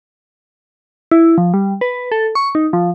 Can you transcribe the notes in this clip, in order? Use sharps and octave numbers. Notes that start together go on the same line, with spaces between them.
E4
F3
G3
B4
A4
C#6
D#4
F3